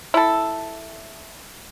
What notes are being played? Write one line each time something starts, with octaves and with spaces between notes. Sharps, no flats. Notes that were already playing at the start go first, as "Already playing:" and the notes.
E4 A4